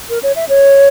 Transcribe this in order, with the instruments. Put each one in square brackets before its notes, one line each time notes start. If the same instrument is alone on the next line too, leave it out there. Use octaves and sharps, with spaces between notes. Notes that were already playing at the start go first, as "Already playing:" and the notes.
[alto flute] A#4
C#5
E5
C#5